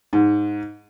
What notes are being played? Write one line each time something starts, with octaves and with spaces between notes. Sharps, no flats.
G#2